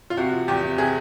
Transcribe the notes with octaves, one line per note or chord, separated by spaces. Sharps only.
F4
C3 F#4
F3
E2 G4
C3
C3 G#4